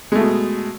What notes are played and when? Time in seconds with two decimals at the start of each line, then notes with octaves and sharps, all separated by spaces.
0.12 G#3
0.15 A3
0.19 B2